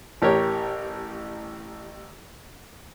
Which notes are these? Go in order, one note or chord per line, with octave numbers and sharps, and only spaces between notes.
A1 G4 A#4 C#5